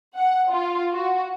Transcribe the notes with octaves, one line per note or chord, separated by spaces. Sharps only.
F#5
F4
F#4